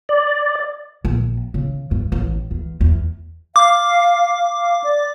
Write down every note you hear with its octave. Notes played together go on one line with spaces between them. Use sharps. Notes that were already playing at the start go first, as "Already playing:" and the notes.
D5
A#1
C#3
G2
A1
E2
E2
F5 D6
F5
D5